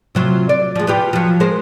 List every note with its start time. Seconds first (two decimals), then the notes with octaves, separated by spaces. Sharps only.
0.15 C3 F#3 F4
0.49 D5
0.75 F3 G#3
0.87 B3 F4 G4
1.13 F3 F#3
1.40 G#3 A#4 C5